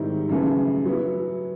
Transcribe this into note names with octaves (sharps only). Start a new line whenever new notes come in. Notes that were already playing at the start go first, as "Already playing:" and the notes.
Already playing: G#2 D#3 G3 C4 E4
F#2 C#3 E3 A3
F#3 B3 E4